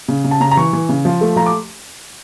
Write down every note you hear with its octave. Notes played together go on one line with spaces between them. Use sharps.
C#3
C#3
A5
C#3 A#5
A#5
E3 C#6
E3
C#3
F3
A3
F3 A#5
D6